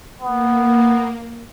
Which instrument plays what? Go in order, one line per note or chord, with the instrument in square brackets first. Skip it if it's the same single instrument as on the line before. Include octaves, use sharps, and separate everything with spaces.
[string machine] A#3 [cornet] B3